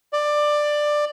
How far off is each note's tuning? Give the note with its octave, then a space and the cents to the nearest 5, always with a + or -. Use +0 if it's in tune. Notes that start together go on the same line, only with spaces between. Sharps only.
D5 +15